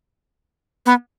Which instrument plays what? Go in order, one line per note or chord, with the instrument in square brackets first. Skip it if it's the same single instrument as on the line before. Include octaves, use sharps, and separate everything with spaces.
[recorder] B3